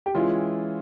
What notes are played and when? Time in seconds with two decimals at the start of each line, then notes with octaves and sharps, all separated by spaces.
0.06 G4
0.15 E3 G#3 C#4 E4 F4 G#4